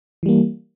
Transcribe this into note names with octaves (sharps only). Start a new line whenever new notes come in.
E3 G3 A#3